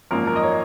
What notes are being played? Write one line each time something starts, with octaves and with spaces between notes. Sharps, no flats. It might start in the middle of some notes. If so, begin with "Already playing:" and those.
G#1 F#2 F3 A#3 A#4
A#4
D#5
C#5